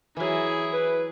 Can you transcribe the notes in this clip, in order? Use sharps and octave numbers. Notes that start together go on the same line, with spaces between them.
E3 F#3 E4 G#4
B4